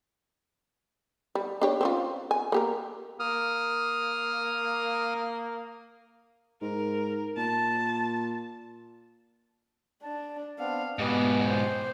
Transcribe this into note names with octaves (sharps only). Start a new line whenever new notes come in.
G3
D4 G4 C#5
C4 C#4 F4
G#5
A#3 G4 A#4
A#3 D#6 F6
G#2 A#4
A#2 A5
D4 A5
B3 C4 D4 F5
G#2 B2 B3 G4 D#5
C5